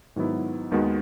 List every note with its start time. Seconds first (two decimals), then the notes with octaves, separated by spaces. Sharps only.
0.16 G#2 D#3 F#3 B3 E4
0.71 D#2 D#3 G#3 B3 F#4